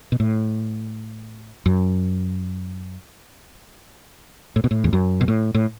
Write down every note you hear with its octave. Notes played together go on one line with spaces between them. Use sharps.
B2
A2
F#2
A2
B2
A2
E2
F#2
B2
A2
A2